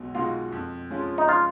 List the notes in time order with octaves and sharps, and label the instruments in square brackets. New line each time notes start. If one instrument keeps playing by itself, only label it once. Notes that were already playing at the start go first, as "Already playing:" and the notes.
Already playing: [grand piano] B1 B2 G#3 F#4
[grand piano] B2 G#3 D#4 F#4 [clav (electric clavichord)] F4
[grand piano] F2
F3 G#3 C#4 F4
[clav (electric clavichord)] D#4
F4